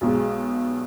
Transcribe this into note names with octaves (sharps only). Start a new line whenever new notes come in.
B1 B2 G#3